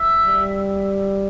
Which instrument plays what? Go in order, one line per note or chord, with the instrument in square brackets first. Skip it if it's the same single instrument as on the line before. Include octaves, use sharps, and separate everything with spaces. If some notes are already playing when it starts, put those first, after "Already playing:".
Already playing: [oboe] E5
[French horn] G3